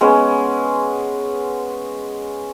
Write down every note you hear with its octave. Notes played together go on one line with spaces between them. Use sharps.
G#3 B3 C#4